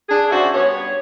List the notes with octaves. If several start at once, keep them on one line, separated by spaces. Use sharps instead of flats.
D4 G#4
C#3 F#4 C5 D5 E5
G2 B3 C#5